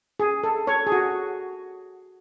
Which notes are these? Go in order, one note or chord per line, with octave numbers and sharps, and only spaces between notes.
G#4
A4
A4 C#5
G#4
F#4